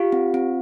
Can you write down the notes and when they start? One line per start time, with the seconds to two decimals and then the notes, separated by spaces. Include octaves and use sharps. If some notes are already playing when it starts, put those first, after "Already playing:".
Already playing: F4 G4 F5
0.12 C4
0.34 C4